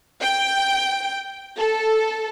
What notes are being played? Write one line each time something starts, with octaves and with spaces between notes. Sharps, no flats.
G5
A4